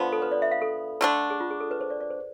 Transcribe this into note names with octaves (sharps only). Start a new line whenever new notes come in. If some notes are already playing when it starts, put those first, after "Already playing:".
Already playing: D3 F3 B3
A4
B4
D5
E5
F5
A4
D3 A3 D4
G#4
F4
G#4
A4
B4
C5
D5
D5
C5